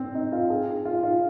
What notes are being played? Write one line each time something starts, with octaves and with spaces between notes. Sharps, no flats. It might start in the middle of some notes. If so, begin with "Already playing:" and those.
Already playing: C4
D#4
F4
G#4
F4
F4